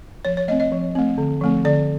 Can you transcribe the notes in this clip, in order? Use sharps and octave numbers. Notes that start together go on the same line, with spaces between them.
F3 C#5
C#5
A3 C4 D#5
D#5
F3
A3 C4
D3
F3 A3 C4
D3 D5